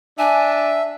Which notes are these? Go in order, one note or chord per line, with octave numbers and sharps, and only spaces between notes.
D4 E5 G#5